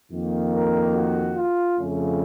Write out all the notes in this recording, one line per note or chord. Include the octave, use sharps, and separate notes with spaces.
F2 D#3 A#3
A#4
F#4
F4
F2 C#3 A3 C#4